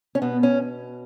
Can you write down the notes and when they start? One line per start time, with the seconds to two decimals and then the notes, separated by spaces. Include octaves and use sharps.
0.15 C#4
0.22 B2 B3
0.43 C#4